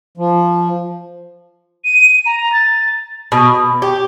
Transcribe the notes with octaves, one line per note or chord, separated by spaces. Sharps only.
F3
D#7
A#5
A6
B2
G4